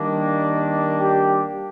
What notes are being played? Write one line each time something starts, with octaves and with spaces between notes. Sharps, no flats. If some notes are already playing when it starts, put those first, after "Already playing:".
Already playing: D#3 G3 A#3 D4
G4